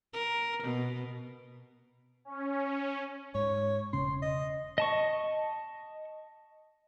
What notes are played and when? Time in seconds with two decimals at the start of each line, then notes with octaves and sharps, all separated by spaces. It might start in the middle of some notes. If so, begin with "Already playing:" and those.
0.13 A#4
0.63 B2
2.25 C#4
3.35 G#2 C#5
3.93 E1 C#3 C#4 C6
4.22 D#5
4.78 D#5 A5 C#6